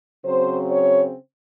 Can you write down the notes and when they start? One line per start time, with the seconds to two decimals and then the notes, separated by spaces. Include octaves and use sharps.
0.24 C#3 F#3 C4 C5
0.69 C#5